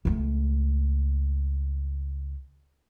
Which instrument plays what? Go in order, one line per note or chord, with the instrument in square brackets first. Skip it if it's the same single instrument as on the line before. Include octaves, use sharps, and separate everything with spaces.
[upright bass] C#2 A3